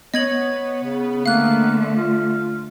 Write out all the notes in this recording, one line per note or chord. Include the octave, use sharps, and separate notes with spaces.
B3 C#5 D#5 G#6 F#7
C#3
D3 A3 A#3 F5 F#6
F4